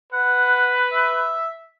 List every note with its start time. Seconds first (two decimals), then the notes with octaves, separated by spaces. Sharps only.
0.12 B4 F#5
0.92 E5